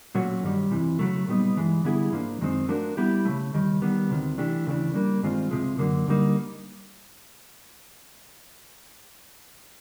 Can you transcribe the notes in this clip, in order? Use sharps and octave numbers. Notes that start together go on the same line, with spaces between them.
A#2 F#3 A3 C#4 F#4
G2 D#3 G3
F2 C3 E3
C#3 F#3 A3
A#2 G3 B3 D#4
G2 E3 G#3
D3 G3 B3 E4 G#4
G#2 F3 A#3 D4
F#2 D#3 G#3 C4 D#4
F3 A3 D4 F#4 A#4
G3 B3 E4 G4
C#3 F#3 A3
D#2 D#3 G3
D#3 G3 B3
D2 C3 D#3
E3 A3 D4 G4
D#2 C#3 E3 A3 D4
G3 A#3 D4
G2 D#3 G#3 C4 F4
C#2 C3 F3 G#3
F#2 D3 F#3 A#3
D2 D3 G3 A#3 D#4